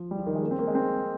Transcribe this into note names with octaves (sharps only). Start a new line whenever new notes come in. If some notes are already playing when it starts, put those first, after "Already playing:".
Already playing: F3
G3
F3
D#3
G#3
A#3
C4
A#3
G#3
C4